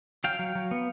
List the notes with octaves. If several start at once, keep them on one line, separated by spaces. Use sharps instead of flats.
F#3 F5 G5
F#3
F#3
B3